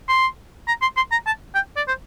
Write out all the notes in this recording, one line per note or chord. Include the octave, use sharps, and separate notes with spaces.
C6
A#5
C6
C6
A#5
A5
G5
D5
C5